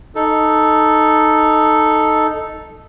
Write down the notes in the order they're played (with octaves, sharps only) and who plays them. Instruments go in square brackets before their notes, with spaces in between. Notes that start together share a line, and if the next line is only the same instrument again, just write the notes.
[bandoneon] D#4 A4